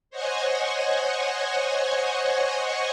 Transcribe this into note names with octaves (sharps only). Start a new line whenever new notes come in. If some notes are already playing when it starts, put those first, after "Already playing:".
C5 C#5 D#5 F#5 G#5 C#6